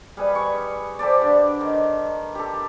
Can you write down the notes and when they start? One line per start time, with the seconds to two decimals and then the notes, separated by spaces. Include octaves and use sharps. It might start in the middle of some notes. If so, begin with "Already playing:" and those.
0.17 G3 G#4 B4
0.35 C#6
0.99 G4 A4 C5 D5
1.22 D3
1.61 D#3
2.35 G4 A4